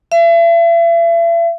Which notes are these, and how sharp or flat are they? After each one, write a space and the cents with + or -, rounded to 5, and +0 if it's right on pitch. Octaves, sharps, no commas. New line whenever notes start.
E5 +40